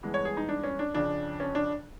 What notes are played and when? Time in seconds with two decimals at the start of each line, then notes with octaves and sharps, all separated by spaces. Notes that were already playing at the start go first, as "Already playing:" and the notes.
0.03 G2 E3 G#3 B3
0.14 C#5
0.25 G#4
0.37 D#4
0.49 D4
0.64 C#4
0.79 D4
0.94 F2 C#3 F3 D4
1.40 C#4
1.55 D4